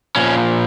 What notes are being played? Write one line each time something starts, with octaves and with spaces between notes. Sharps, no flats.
A#2 F3 C#4